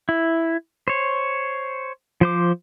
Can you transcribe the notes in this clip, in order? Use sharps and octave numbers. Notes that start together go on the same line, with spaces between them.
E4
C5 C#5
F3 C5 D6